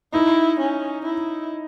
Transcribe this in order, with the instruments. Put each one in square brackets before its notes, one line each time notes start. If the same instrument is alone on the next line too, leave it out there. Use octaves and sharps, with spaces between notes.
[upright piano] D#4 [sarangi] E4
[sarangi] C#4
E4